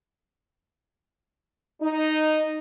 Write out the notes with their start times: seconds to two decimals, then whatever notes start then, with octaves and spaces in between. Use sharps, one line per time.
1.82 D#4